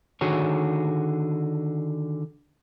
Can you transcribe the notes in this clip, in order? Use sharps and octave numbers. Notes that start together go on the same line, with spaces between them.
D3 D#3 F#4 G#4 C#5